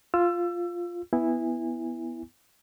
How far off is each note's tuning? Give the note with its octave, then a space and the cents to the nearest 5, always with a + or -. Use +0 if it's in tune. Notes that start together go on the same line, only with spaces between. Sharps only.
F4 +0 E6 +25
B3 +0 E4 +0 G#5 -20